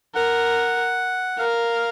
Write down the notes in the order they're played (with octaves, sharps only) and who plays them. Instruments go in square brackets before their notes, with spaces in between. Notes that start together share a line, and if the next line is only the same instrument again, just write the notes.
[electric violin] A#4 [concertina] F#5
[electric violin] A#4 [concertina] F5